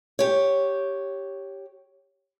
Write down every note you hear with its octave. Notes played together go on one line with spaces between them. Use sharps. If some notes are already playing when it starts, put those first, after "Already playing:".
G4 C#5